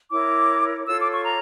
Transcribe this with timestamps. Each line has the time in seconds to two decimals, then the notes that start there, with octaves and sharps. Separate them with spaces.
0.11 E4 A#4 C#5 D6
0.86 F4 A4 C#5 E6
0.99 D6
1.13 C#6
1.25 A#5